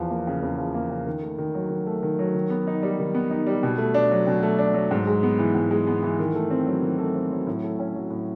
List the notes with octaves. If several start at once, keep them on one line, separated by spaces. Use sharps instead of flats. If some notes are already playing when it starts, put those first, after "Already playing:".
Already playing: E2 F3
A#3
C#3
E2
F3
A#3
C#3
D#3
A3
D#3
F#3
D#3
A3
D#3
F#3
D#3
B3
D#4
G3
D#3
B3
D#4
G3
B2
A3
D4
F#3
B2
A3
D4
F#3
G#2
G#3
B3
E3
G#2
G#3
B3
E3
D#3
A3
C4
F#3
D#3
A3
C4
F#3
A2
A3
C#4
F#3
A2